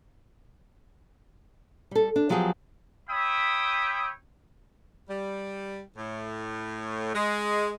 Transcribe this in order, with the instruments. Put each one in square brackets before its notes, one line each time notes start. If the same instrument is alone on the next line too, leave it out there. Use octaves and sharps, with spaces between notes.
[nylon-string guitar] G3 A4
D4
F3 F#3 B3 G4 G#4
[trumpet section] C#5 E5 G5 B5 D#6
[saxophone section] G3
A2
G#3